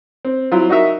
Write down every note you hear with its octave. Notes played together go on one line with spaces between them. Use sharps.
C4
F#3 C4 E4 F4
D#4 F#4 A#4 E5